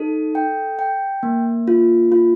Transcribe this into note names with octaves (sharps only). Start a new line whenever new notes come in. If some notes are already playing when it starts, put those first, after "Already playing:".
Already playing: D#4 A4
G5
G5
A#3
F4
F4